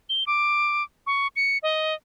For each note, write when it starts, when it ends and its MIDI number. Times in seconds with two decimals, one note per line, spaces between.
0.09 0.24 103
0.27 0.83 86
1.07 1.27 85
1.36 1.58 97
1.63 1.94 75